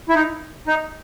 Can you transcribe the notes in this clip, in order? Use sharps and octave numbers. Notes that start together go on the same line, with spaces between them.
E4
D#4
D#4